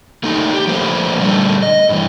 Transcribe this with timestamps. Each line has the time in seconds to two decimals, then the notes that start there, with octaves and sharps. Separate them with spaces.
0.23 A3 A#3 D#4
0.54 G4
0.67 F3 A3 A#3 B4 C5
1.19 A#2 D3 G3 A3
1.62 D#5
1.89 G2 E3